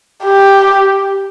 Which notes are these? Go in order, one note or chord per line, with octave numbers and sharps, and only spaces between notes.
G4